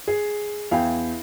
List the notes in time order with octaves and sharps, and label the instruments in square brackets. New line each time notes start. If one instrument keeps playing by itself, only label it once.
[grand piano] G#4
[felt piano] E2 G5 [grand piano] E4 F5